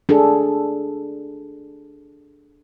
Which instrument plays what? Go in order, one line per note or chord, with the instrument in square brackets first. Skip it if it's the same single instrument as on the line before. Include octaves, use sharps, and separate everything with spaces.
[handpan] D4 G#4 A4